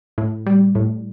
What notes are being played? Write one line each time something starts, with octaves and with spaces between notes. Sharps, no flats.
A2
G3
A2